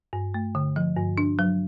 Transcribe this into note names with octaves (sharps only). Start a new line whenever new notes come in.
G2
A3
D3
F3
G2
D4
F#3